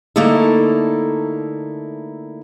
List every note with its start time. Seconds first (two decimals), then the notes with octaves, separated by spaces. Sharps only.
0.16 D3 A3 A#3 D#4 E4 A4